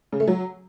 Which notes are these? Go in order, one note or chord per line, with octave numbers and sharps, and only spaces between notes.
C#3
A3
F#3